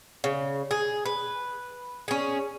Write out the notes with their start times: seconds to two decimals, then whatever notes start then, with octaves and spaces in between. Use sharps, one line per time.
0.24 C#3
0.71 G#4
1.05 B4
2.08 C#4 G#4